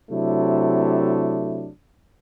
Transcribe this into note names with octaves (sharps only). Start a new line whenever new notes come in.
C3 F#3 A3 D4 E4